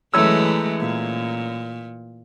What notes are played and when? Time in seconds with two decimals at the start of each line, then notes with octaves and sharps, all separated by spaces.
0.14 F#2 E3 G#3 A3 C#5 E6
0.80 A#2